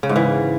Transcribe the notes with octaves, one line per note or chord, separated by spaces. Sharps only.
C#3
G#2
E3